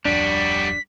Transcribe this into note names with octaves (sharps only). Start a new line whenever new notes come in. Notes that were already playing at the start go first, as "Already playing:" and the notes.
D1 F2 G3 D4 F#4 B6